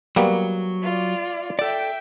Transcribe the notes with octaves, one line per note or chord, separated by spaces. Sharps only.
F#3 G3 A#3 B3
F4 D5
A4 D5 E5 G5